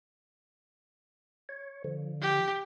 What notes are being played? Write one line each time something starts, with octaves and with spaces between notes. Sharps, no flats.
C#5
D3 F3
G4